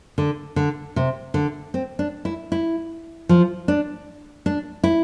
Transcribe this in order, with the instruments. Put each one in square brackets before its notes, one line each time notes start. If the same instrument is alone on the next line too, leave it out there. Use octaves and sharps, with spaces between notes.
[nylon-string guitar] D3
D3
C3
D3
C4
D4
E4
E4
F3
D4
D4
E4